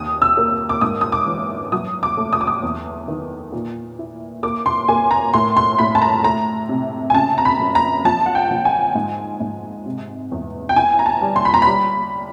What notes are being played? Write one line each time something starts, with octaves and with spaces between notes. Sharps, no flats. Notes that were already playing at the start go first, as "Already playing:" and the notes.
Already playing: D#2 D#6
E6
A#3
D6
G#2 D#6
D#6
D6
E3
F#3 D#6
D6
A3
D#6
D6
D#6
E2
D#3
A#2
E4
A#3 D6
C6
A#3 G#5
A#5
A2 C6
C6
A2 B5
A5
A#5
A3 A#5
C3
G#5
C#3 A5
A#5
B5
F#2
A#5
F3 A5
F#5
G5
F3
G#5
G#2
G#2
C3
E2
G5
E4 G#5
A#5
A5
G3
C6
B5
A#5
G3 B5